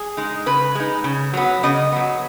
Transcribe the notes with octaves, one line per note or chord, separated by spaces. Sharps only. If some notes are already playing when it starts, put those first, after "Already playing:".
Already playing: G#4
G#3 D#4
C#3 B4
G#3 D#4
C#3
F#3 B3
C#3 D#5
F#3 B3